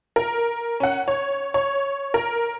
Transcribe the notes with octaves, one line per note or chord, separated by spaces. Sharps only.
A#4
C#4 F#5
C#5
C#5
A#4